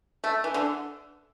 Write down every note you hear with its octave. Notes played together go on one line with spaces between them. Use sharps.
A3
E3
D3